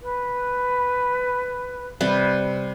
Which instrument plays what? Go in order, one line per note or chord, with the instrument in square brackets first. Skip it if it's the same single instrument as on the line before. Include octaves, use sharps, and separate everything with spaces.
[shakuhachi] B4
[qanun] C3 G3 B4